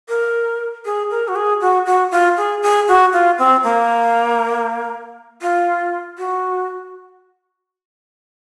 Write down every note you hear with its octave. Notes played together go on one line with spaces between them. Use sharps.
A#4
G#4
A#4
F#4
G#4
F#4
F#4
F4
G#4
G#4
F#4
F4
C4
A#3
F4
F#4